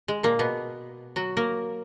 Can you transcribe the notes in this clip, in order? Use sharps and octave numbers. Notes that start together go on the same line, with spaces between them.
G#3
A#2 A#3
B2 B3
F#3 F#4
A#3 A#4